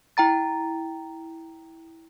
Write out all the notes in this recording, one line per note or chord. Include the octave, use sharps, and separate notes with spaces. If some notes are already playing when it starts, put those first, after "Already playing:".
E4 G5 A#5 A6